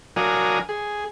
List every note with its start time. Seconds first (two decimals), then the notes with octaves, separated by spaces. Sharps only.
0.16 F#3 D4 A#4 F5 G#5 D#6
0.69 G#4